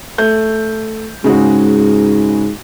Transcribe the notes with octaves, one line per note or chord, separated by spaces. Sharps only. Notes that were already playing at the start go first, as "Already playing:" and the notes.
A3 G6
G#2 C#3 G#3 F#4